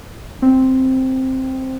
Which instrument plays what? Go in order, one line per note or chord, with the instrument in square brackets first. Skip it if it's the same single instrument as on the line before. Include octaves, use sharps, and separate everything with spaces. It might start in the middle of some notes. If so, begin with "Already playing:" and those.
[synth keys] C4